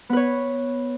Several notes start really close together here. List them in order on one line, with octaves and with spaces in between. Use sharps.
B3 B4 C#5